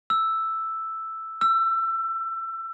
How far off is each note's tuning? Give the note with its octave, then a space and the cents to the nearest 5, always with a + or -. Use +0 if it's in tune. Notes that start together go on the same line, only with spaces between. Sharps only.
E6 +0
E6 +25